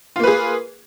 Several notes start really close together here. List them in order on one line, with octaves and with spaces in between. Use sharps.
F4 A#3 B4 G#4